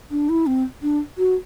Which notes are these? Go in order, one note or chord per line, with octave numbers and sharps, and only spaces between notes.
D4
E4
C4
D4
F#4